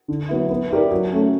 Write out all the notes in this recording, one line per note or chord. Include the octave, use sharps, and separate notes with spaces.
D3
F#3 B3 E4
B3
E4 G4 A#4 D5
F#3
A3 C#4